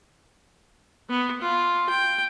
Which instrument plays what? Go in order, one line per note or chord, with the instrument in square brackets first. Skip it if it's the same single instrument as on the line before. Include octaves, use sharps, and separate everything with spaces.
[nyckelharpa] B3
F4
G5